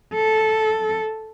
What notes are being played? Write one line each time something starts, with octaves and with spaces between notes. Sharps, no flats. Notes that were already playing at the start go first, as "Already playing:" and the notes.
A4